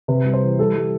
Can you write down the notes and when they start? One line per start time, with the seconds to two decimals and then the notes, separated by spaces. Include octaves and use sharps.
0.08 C3 B4
0.25 G3
0.33 C5
0.42 E3
0.58 G3 A4
0.75 G3